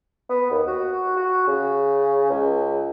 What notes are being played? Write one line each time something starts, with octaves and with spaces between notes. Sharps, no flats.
B3
D#2
F#4
F#4
C#3
C#2